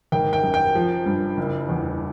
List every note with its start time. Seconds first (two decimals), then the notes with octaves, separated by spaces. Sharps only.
0.12 G#1 G5
0.33 G5
0.43 F#2
0.54 G5
0.75 F3
1.06 G2
1.37 F#1
1.69 E2